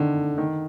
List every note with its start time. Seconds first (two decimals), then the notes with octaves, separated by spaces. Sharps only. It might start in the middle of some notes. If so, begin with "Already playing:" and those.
Already playing: D3 D#3
0.38 D#3